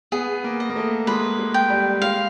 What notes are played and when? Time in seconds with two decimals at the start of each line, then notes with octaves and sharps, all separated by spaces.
0.12 B3 G#4
0.44 A#3
0.60 D#5
0.70 A#3
0.76 A3
1.07 G#3 B4
1.39 G#3
1.54 G5
1.70 G3
2.01 G#3 F5